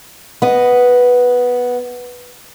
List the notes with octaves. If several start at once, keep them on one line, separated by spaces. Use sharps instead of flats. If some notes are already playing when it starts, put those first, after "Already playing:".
B3 D#5